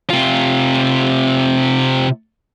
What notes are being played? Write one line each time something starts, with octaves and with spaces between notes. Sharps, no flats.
C3 F4